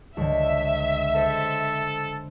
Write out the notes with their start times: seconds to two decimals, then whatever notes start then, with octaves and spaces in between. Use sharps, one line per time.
0.17 C#2 D3 E5
1.16 A4 C5